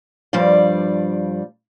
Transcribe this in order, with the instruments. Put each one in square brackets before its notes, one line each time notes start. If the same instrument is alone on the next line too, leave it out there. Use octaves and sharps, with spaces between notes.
[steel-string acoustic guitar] G2 F3 G3 D5 F5